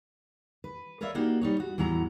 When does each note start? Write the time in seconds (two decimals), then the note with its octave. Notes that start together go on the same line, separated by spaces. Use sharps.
0.64 B4
1.01 A#4 B4 C#5 D5 E5 F5
1.15 A#3 D4 D#4 F#4 G4
1.41 G3 D#4 C#5
1.60 F#4
1.78 E2 A2 F#3 F#5 A#5